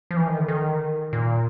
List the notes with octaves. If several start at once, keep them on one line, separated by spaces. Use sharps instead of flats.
F3
E3
D#3
D3
D#3
A#2